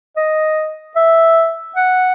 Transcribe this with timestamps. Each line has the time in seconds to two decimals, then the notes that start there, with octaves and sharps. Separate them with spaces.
0.17 D#5
0.96 E5
1.76 F#5